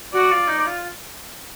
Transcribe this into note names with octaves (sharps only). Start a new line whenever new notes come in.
F#4 D5
F4
D#4
F4